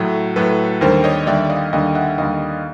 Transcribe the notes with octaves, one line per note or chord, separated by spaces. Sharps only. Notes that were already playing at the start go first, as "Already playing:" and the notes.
Already playing: A2 F#3 A3
A2 F#3 A3 A4 B4
D#2 D3 G3 A#4 C5
C#5 D#5
D#2 D3 G3 D5 E5
D#5 F5
D#2 D3 G3 D#5 F5
E5 F#5
D#2 D3 G3 D#5 F5